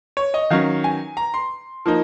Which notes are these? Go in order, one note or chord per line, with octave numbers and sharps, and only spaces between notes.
C#5
D#5
D#3 F#3 C#4 F5
G#5
A#5
C6
F3 A#3 D#4